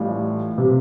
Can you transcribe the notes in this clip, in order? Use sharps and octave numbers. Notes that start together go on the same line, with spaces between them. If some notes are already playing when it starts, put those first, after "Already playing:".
Already playing: A1 A2 E3 G3 F4
C3